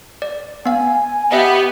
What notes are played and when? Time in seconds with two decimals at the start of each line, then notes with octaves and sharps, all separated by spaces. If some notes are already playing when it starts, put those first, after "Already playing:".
0.22 D5
0.66 B3 F5 G#5
1.02 G#5
1.32 B3 G4 D#5 E5 G5